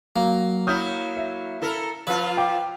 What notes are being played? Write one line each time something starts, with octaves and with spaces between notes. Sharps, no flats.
F#3 A#3
F#3 E4 D#6 F6 G6
E5
E4 A4 A#4
F3 F4 B4
G5 D6